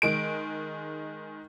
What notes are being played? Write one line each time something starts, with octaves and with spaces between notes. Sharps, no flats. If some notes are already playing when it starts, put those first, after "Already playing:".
D#3 G#3 D7